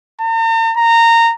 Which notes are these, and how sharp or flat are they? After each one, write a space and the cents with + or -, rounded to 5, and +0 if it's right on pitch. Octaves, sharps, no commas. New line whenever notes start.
A#5 -45
A#5 -20